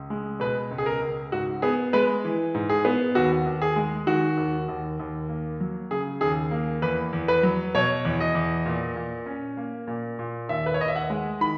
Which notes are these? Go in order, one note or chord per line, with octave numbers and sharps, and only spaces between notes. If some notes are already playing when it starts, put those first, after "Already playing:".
Already playing: C#2
G#3
B2 B4
C#2
G#4
A#4
C#2
G#2 F#4
B3 G#4
G#3 B4
E3
G#2
G#4
B3
D#2 F#4
D#2
G#4
G#3
D#3 F#4
D#2
D#2
D#2
A#3
F#3
C#3 G#4
D#2 G#4
A#3
E2 B4
E2
B4
F#3
B2 C#5
E2
D#5
E2
A#2
A#2
C#4
A#3
A#2
A#2
D#2 E5
B4
C#5
D#2 D#5
E5
F#5
G#3
D#3 B5